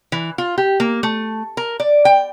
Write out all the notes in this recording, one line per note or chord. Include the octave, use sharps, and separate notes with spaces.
E3
F4
G4
A#3
A3
A#4
D5
G5